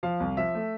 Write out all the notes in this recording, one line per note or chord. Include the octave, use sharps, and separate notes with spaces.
F3 F5
C2
F3 E5
A3